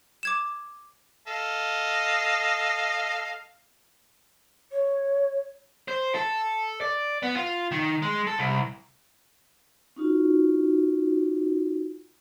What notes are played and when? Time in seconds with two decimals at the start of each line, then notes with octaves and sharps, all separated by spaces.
0.23 D6 G#6 E7
1.27 A4 D#5 F5
4.72 C#5
5.88 C5
6.15 A4
6.81 D5
7.23 B3
7.36 F4
7.71 D#3
8.02 G#3
8.27 A4
8.39 C2
9.96 C#4 D#4 F4 F#4